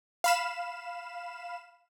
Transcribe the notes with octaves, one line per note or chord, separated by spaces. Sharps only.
F5 B5 E7